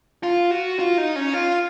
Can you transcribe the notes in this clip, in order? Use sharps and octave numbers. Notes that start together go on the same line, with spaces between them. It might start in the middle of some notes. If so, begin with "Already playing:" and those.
F4
F#4
F4
D#4
C#4
F4